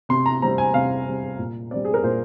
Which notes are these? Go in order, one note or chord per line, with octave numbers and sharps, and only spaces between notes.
C3 C6
A#5
G3 C4 A#5
G#5
C3 F5
G3 C4
A#2
G3 C4 D5
G#4
A#4
A#2 C5